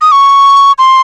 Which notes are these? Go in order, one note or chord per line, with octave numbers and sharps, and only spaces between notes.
D#6
C#6
C6